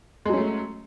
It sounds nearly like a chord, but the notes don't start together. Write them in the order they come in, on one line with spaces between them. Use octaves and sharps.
G#3 F#3 C#4 A3